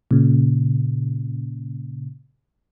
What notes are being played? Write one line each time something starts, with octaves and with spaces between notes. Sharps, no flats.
A#2 C#3